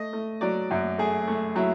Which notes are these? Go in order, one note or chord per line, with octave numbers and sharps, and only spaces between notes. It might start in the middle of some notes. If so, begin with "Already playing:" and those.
Already playing: A3 D#5
A3
F#3 D5
F#2
A3 G#4
A3
F#3 E4